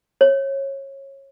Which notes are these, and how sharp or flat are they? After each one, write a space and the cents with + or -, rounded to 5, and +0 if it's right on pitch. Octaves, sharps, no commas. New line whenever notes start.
C#5 -25